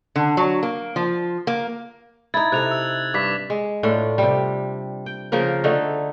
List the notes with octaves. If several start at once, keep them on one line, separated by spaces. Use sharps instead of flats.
D3
F#3
A#3
F3
A#3
D#4 E4 G#6 A6
C3 A4 F#6 F7
E6
G2 D6 B6
G#3
A2 D4 F4
C3 G3
G5
C#3 F3 A#3 A#4
D3 A3 D#4